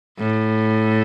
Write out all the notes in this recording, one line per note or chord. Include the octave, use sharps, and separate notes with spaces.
A2